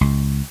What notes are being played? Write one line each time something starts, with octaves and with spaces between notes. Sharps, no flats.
C#2